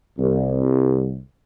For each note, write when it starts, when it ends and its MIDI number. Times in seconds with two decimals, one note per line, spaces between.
0.18 1.18 36